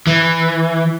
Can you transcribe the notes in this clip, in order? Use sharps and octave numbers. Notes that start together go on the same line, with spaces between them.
E3